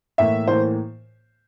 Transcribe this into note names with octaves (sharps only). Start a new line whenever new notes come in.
A2 E3 A#3 E5
A2 E3 A#3 C5